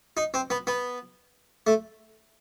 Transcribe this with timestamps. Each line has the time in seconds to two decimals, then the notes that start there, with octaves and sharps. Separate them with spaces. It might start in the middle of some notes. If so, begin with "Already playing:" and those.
0.17 D#4
0.34 C4
0.50 B3
0.67 B3
1.67 A3